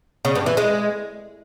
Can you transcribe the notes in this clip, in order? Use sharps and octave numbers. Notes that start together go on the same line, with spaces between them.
C#3
G2
E3
G#3